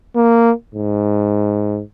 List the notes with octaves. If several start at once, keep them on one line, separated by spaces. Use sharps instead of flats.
A#3
G#2